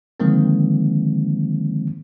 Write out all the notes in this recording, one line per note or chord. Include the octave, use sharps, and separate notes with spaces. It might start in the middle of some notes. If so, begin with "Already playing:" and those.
D3 D#3 F3 G#3 A#3 C4